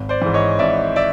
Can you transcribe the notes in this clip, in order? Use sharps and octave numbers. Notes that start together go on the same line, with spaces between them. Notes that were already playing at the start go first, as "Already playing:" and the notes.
Already playing: G#1
C5 D5
G#2 E3
C#5 D#5
G#1 D5 E5
D5 E5